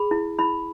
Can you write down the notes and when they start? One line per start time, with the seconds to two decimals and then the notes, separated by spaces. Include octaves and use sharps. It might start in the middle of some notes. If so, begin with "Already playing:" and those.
Already playing: G#4 B5
0.11 E4
0.39 E4 B5